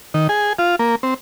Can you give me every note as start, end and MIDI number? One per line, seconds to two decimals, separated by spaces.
0.14 0.27 51
0.29 0.53 68
0.59 0.76 65
0.79 0.95 58
1.03 1.14 60